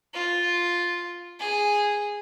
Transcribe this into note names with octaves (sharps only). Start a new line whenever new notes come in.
F4
G#4